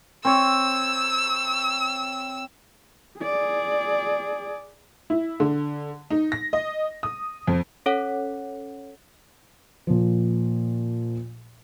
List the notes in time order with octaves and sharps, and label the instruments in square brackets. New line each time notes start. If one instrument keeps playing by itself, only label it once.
[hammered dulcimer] C4 C#5 [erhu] E6
[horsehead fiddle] G#4 D5
[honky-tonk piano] E4
D3
D#4
A#6
D#5
D#6
F2
[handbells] C#4 A4 C#5 F#5
[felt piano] A#2 F3